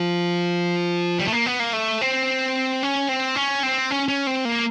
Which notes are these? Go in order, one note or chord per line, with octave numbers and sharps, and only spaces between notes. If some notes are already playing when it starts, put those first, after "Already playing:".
Already playing: F3
G3
A3
A#3
B3
A#3
A3
C4
C#4
C4
C#4
C4
C#4
C#4
C4
A#3